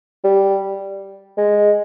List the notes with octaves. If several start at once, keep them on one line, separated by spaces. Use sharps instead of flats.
G3
G#3